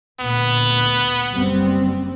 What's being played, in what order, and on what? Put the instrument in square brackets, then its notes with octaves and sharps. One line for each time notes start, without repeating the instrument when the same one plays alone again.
[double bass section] D2 A#2 [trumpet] B3
[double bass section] F#1 G3 C4